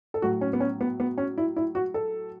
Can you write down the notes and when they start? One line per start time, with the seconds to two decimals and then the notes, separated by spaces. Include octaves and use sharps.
0.14 A4
0.22 A2 F#3 F#4
0.41 C#4
0.53 B3
0.60 C#4
0.81 B3
1.00 B3
1.18 C#4
1.38 E4
1.56 E4
1.75 F#4
1.94 A4